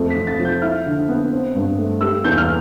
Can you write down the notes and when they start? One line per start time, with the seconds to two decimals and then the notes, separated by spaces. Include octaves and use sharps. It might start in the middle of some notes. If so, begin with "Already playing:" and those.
Already playing: F2 A3
0.10 B6
0.16 F2
0.27 A6
0.39 F3
0.45 G6
0.62 E4 F6
0.86 D3
1.09 B3
1.32 C4
1.55 G2
1.78 A3
2.01 G3 E6
2.24 E2 G6
2.38 F6